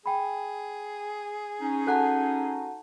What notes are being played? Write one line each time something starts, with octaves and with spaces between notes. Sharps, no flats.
G#4 G5 B5
C#4 D#4
F#4 A4 F#5 G#5 A5 F#6